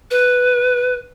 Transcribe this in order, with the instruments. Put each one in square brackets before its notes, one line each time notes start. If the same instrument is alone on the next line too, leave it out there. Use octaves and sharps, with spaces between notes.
[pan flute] B4